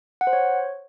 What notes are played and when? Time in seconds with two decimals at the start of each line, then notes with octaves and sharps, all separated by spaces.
0.21 F#5
0.27 C5
0.33 C#5